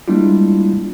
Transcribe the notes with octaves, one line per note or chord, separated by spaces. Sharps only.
G3 G#3 A#3 D4 E4 F4